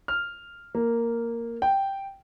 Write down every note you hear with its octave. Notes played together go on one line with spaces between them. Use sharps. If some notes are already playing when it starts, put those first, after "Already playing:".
F6
A#3
G5